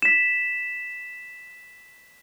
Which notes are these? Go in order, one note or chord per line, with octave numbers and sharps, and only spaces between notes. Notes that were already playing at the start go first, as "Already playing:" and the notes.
B6 E7